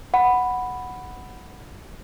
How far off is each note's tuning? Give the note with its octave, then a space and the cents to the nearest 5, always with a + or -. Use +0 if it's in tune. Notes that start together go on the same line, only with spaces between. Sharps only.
F#5 +0 B5 +0